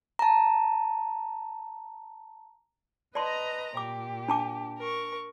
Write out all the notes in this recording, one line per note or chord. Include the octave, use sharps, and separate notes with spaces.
A5 A#5
B4 D5 D#5 A5 A#5 C6
A#2 G4 D6
D4 A5 D6
A#4 C#6